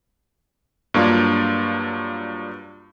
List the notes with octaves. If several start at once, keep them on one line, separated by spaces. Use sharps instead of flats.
G2 F#3 A#3 D4 F4